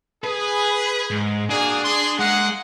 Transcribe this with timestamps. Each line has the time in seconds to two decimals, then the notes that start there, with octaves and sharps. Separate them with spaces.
0.24 G#4 B4
1.10 G#2
1.50 A#3 D4 F#4 G#4
1.84 G#4 C6
2.19 G#3 A#3 G#4 F#5